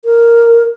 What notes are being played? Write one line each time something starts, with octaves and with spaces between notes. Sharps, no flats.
A#4